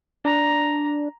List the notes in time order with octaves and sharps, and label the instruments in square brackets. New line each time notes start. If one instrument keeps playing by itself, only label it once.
[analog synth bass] D4 [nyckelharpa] A#5